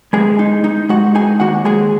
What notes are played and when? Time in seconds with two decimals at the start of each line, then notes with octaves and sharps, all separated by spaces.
0.13 G#3 G#4 G#5
0.39 D#4
0.64 D#4
0.89 G#3 F#4 F#5
1.15 D#4 G#4 G#5
1.40 D#2 F#4 F#5
1.65 G#3 G#4 G#5